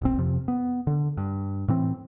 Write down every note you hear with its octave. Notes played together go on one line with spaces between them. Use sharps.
D#1 B1 C4
F2 C3 F3
B3
D3
G2
A2 E3 C4